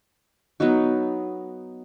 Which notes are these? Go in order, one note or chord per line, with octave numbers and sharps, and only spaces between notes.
F#3 B3 D#4 F#4